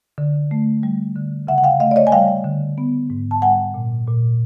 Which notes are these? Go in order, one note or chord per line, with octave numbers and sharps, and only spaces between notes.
D3
A3
G3
D3
C#3 E5 F#5
F#5
F5 G5
A3 D#5 F5
D5
C#5 D#5
G#5
G3 F5 G5
D3
B3
G#2
A5
G3 F#5 G#5
A#2
A#2